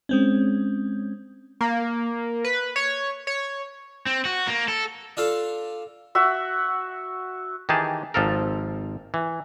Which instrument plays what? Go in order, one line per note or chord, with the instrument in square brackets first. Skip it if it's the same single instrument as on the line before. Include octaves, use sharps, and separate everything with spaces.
[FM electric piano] G#3 C4 C#4
[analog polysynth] A#3
B4
C#5
C#5
[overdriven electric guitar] C4
F#4
A#3
A4
[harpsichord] D4 F4 A4 F5
[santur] F#4 E5
[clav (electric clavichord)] D#3 E3 D#4 G4 G#4 A5
G#1 F3 F4 A4 A#4
E3